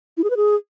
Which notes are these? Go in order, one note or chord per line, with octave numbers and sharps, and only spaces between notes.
E4
G#4
B4
G#4